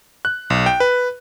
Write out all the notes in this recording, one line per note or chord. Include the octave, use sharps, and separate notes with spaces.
F#6
B1
G5
B4